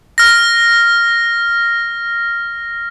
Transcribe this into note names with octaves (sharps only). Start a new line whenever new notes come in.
F6 A#6